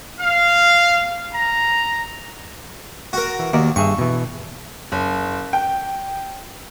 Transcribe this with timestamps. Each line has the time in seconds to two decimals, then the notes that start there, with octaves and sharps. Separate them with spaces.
0.19 F5
1.32 A#5
3.13 F#4 A#4
3.39 E3
3.53 D#2 F#4 A#4 D5
3.76 G2 G#4 E5 C#6
3.98 B2 E3
4.92 F#1
5.53 G5